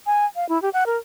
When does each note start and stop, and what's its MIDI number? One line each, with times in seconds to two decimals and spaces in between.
0.07 0.26 80
0.36 0.48 77
0.49 0.60 64
0.62 0.69 67
0.73 0.84 78
0.86 0.97 70